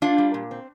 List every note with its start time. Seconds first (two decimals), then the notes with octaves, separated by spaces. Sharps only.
0.02 A#3 D4 F4
0.18 G3
0.34 A#2
0.51 C4